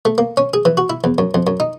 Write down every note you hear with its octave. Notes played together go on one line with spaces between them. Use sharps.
A3
A#3
C#4
G#4
E3
F#4
E4
E2
F#2
F2
F#2
D#4